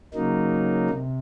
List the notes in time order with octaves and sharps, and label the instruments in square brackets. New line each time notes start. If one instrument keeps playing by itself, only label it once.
[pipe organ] C#3 F#3 A#3 D#4
C3